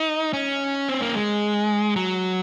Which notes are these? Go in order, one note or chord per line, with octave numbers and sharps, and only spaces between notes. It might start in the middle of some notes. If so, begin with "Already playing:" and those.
Already playing: D#4
C#4
C4
A#3
G#3
F#3